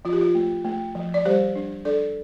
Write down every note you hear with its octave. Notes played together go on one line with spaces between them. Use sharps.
F3 F4
G4
F4
A3
A3
F3
D5
G3 G4 C5
D4
D4 A4 D5